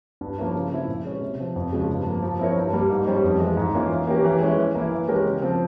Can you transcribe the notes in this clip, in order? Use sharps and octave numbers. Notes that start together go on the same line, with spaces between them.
G2
F3 A#3 C#4 E4
C#3
F3 C4 E4
A#2
G#3 C#4
C3
F3 C4
F2
C#3 F3 G#3 C4
G2
F3 A#3
F3
C4 E4 A#4 C#5
G2
G3 A#3
G#2
G3 C#4 G4 C5
F2
E3 G#3
G#2
E3 A#3 C#4 F4
E3
A#3 C#4 G4 A#4
E3
G#3 C#4 E4
E3
A#3 E4
E3
G#3 C#4 G4 A#4
C#3
F3 C4